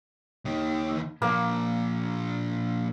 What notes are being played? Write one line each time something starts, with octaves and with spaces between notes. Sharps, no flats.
D#2 D#3
A#2 F3 A#3